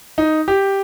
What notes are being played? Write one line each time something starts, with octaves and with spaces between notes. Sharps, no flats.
D#4
G4